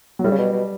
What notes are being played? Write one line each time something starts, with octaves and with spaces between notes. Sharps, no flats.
F#3
A2 G3
C#3
B2
B2